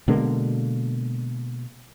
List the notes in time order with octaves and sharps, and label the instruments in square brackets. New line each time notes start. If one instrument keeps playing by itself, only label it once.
[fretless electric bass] B2 D3 G#3 A#3